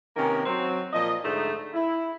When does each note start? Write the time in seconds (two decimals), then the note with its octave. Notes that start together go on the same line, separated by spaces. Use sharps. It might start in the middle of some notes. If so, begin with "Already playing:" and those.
0.16 C3 D#3 A#3 B3 C#4
0.46 F#3 C4
0.92 A#2 F3 D#5
1.23 G#2 D3 A3 D#4
1.73 E4